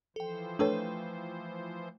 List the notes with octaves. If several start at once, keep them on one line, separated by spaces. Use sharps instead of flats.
E3 F3 A4 C5 G5
A3 D4 A4 B4 C#5 G5